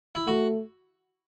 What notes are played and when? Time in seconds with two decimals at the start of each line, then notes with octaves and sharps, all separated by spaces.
0.15 E4
0.27 A3 F#4